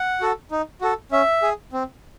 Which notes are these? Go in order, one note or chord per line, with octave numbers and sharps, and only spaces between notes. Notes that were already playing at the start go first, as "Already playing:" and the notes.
Already playing: F#5
F#4 A4
D#4
F#4 A4
C#4 E5
G#4
C4